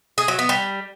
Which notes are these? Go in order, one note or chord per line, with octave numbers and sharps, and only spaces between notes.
G#4
F#3
B3
G3